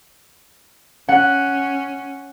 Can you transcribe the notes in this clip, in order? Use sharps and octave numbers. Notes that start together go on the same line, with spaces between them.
C#4 F#5